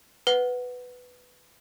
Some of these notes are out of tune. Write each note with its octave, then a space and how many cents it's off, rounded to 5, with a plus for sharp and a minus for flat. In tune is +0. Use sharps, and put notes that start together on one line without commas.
B4 +10 F#5 +0